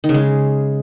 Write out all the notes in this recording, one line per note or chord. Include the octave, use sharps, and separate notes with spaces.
D#3
C#3
G#3